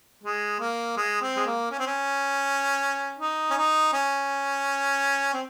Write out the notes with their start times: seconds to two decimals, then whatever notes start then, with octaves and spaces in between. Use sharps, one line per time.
0.24 G#3
0.60 A#3
0.97 G#3
1.22 C4
1.37 G#3
1.47 A#3
1.71 C#4
1.79 C4
1.87 C#4
3.19 D#4
3.51 C#4
3.57 D#4
3.93 C#4
5.34 C4